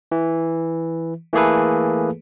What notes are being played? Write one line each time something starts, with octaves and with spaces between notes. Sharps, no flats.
E3
E3 A3 A#3 G#4 A4 B4